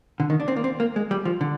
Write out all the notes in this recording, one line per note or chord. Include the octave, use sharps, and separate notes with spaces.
D3
D#3
D4
C4
A#3
C4
A#3
G#3
G3
F3
D3